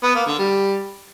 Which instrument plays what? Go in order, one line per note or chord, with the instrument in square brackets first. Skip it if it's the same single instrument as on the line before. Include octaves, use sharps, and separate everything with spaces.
[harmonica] B3
A#3
D3
G3